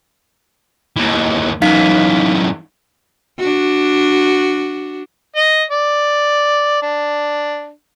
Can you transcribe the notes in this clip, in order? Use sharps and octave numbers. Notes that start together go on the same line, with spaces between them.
D#2 E3
F#2 E3 D#4 F5 B6
D4 F#4
D#5
D5
D4